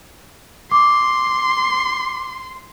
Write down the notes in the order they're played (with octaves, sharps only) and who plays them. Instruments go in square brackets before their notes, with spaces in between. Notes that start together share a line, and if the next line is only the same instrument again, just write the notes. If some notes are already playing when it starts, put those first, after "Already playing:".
[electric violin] C6 [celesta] D6